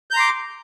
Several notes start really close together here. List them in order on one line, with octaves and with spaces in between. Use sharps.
G6 A#5 C6 D6